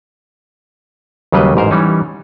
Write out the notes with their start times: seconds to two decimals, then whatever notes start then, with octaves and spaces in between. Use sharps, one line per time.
1.32 D#2 C#3 F#3 G3 B4 D#5
1.56 A1 G#2 A#4 C5
1.71 E3 G3 C#4 D#4